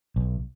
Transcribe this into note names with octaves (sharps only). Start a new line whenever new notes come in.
B1